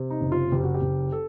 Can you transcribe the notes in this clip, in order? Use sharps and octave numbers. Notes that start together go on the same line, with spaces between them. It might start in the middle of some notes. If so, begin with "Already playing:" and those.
Already playing: C3
D#4
F#1
F4
F#1 G4
F#4
G4
F#1
A4